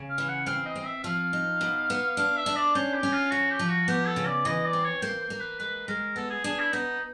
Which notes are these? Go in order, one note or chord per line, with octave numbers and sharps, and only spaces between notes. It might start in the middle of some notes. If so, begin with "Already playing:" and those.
Already playing: C#3
F5
E3
F#5
C4 F5
D#5
C4
E5
F3 F5
D#4
B2
B3
D4 F5
E5
D4
D5
C#4 C5
G4
C#4
F4
F3 F#4
G4
F3
F#4
B3 G4
A4
C#3
D5
E3 D#5
D5
C4
C#5
A#3 C5
C5
A#3
B4
G#3 B4
G#3 A#4
B3 A4
G#4
D4 G#4
E4
B3 D#4